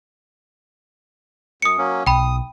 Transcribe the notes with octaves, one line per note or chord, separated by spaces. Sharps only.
F#2 D#6 C#7
F#3 A#3 C#4
B1 G5 B5 D#6